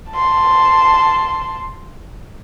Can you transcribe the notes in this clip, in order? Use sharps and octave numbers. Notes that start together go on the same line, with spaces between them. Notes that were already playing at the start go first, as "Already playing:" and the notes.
A5 C6